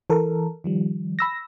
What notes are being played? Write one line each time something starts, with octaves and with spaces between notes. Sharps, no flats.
E3 A4 A#4
D#3 F3 G3
B5 E6 A#6